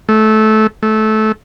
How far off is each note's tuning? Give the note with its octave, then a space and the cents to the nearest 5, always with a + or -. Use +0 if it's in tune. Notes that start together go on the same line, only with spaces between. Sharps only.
A3 -20
A3 -20